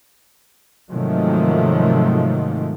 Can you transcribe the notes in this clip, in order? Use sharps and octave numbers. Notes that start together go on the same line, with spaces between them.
G#2 C3 D#3 F3 F#3 A3